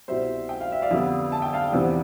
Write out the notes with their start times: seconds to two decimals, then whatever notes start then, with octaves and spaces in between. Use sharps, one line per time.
0.08 C2 B2 G3 C5 E5
0.49 G5
0.61 F5
0.72 E5
0.82 D5 F5
0.91 F2 D3 G3 B3
1.32 A5
1.42 G5
1.53 F5 A5
1.72 E2 C3 F3 B3 D4